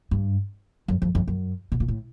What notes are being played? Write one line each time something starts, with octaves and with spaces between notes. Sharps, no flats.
G2
F#2
F2
F2
F#2
B2
A#2
A2